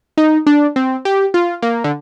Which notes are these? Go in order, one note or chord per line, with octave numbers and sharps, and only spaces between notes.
D#4
D4
C4
G4
F4
A#3
D3